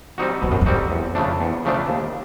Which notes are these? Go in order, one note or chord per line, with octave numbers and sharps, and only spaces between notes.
G3 C4 D#4 F#4
F2 B2
F#2
F2
G3 C4 D#4 F#4
E2
C#3 F3 A3 D4
E2
C#3 F3 A3 D4
D#2